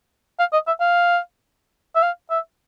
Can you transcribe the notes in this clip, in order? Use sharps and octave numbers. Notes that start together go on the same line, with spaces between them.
F5
D#5
E5
F5
E5
F5
E5